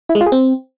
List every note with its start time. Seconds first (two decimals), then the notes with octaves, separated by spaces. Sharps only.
0.09 E4
0.15 G#3
0.21 F4
0.26 G#4
0.32 C4